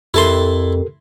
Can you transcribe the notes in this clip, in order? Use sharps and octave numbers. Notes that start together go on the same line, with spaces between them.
F2 E4 G4 A4 A#4 A5 C6